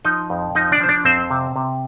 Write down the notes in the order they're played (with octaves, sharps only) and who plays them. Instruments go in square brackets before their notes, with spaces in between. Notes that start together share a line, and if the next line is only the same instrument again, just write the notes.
[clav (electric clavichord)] F3 D#4 D#5
F2
F3 D#4 D#5
D4 D5
F3 C5
D4 D5
F2 C4 C5
C3
C3